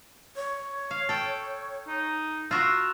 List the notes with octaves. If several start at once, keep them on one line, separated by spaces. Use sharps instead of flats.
C#5
F5
A4 G5
D#4
F4 F#4 A#4 E6